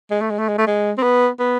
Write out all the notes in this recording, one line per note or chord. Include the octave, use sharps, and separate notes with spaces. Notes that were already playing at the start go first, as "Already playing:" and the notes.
G#3
A3
G#3
A3
G#3
A3
G#3
C4
B3
B3